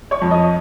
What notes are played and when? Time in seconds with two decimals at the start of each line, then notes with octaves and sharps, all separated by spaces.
0.11 C#5 C#6
0.22 F2
0.31 D#5 D#6